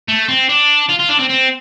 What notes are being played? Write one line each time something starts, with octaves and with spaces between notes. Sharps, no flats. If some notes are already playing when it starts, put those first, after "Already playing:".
A3
C4
D4
F4
F4
D4
C4
C4